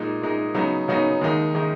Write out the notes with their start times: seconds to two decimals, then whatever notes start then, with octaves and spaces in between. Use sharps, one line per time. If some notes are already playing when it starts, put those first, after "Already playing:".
Already playing: A#2 G#3 D#4
0.21 A#2 G#3 D#4
0.54 C#3 F#3 B3 D#4
0.88 C#3 F#3 B3 D#4
1.21 D#2 D#3 G#3 D#4
1.55 D#3 G#3 D#4